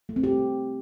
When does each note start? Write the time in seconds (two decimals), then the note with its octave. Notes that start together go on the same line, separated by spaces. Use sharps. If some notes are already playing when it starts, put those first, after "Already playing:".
0.09 A3
0.16 C4
0.24 G4